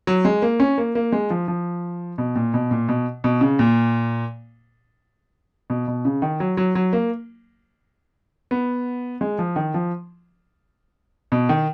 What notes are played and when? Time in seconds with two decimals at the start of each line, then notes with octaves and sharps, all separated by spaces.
0.07 F#3
0.25 G#3
0.42 A#3
0.60 C#4
0.78 A#3
0.95 A#3
1.12 G#3
1.30 F3
1.48 F3
2.18 B2
2.36 A#2
2.54 B2
2.71 A#2
2.89 B2
3.24 B2
3.41 C#3
3.59 A#2
5.70 B2
5.88 B2
6.05 C#3
6.22 D#3
6.40 F#3
6.57 F#3
6.75 F#3
6.93 A#3
8.51 B3
9.21 G#3
9.39 F3
9.56 D#3
9.74 F3
11.32 B2
11.49 D#3